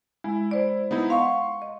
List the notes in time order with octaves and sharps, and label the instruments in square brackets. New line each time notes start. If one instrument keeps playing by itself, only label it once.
[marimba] G#3 [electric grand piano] E4
[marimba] C5 D5
[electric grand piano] B3 D#4 E4
[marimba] F5 F#5 [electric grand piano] C6 C#6
[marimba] D#5